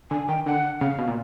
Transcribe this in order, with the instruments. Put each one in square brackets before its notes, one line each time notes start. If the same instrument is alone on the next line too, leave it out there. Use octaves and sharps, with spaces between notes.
[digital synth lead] D3 [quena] G#5
[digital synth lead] D#3 [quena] G5
[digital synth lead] D3 [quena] F#5
[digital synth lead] C#3 [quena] F5
[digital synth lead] B2
A#2